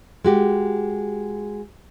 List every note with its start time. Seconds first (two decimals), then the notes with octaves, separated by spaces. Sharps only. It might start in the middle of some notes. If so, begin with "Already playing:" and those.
0.25 G#3 F#4 G4